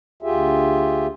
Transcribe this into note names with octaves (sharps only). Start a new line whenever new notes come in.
D2 F4 G4 G#4 E5